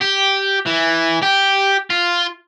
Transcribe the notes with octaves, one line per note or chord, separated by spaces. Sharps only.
G4
E3
G4
F4